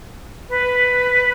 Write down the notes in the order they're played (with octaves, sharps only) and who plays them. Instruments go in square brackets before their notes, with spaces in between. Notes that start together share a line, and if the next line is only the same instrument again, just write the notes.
[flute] B4